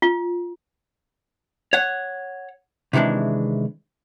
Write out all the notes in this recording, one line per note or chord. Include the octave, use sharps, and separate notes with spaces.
F4
C#5 F#5
C3 D#3 E3 G#3 D4